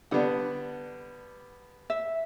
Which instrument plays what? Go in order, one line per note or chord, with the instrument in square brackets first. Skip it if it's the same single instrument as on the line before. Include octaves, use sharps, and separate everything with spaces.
[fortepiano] D3 G3 B3 D4 [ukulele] F#5
[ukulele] E5